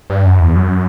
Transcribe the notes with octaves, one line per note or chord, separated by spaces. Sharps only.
G2
F#2
E2
F#2